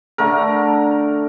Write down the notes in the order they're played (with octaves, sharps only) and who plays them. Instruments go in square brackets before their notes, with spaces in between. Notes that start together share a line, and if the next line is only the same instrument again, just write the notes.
[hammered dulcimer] D3 A3 A#4